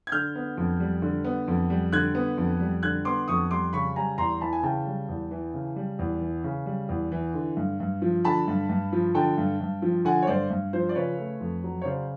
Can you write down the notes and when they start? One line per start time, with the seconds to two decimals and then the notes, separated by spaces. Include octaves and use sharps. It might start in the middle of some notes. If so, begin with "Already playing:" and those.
0.07 G#6
0.12 D3 F6 G6
0.35 B3
0.57 F2
0.80 G3
1.02 D3
1.24 B3
1.48 F2
1.70 G3
1.93 D3 F#6 G#6
2.15 B3
2.38 F2
2.60 G3
2.83 D3 F#6 G#6
3.05 B3 C6 D6
3.28 F2 C#6 D#6
3.51 G3 C6 D6
3.73 C#3 B5 C#6
3.96 G3 G#5 A#5
4.18 E2 A#5 C6
4.41 E3 A5 B5
4.53 G#5
4.63 C#3 G5 A5
4.87 G3
5.09 E2
5.31 E3
5.54 C#3
5.76 G3
5.99 E2
6.21 E3
6.44 C#3
6.66 G3
6.89 E2
7.12 E3
7.34 D3
7.57 G2
7.80 G2
8.02 F3
8.25 D3 A5 B5
8.48 G2
8.69 G2
8.93 F3
9.15 D3 G5 A5
9.38 G2
9.61 G2
9.82 F3
10.05 D3 F#5 G#5
10.23 C#5
10.27 G2 C5 D5
10.50 G2
10.73 F3 C5
10.89 D5
10.95 C#3 B4 C#5
11.19 A3
11.40 F2
11.64 F#3
11.82 C#5
11.85 C#3 C5 D5